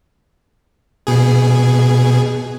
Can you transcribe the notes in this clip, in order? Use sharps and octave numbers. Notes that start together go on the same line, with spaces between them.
B2 G#4